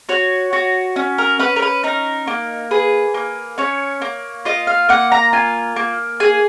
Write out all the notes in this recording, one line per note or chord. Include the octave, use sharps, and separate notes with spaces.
F#4 C#5
F#4
C#4
A#4
C#4 B4
A#4
B4
D#4 A#4
A#3
G#4 B4
A#3
C#4 C#5
A#3
F4 D#5
F5
A#3 F#5
A#5
F4 G#5
A#3
G#4 G#5